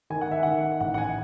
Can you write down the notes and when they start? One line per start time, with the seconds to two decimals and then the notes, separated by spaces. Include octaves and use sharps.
0.10 D#3 G#5
0.21 F#5
0.31 E5
0.43 D#3 F#5
0.80 A1 F#5
0.94 F#5
0.98 G#5